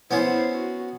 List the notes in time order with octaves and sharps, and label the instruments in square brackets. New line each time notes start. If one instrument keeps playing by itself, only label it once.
[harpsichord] B3 C#4 [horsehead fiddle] E4 C5
[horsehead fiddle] F#4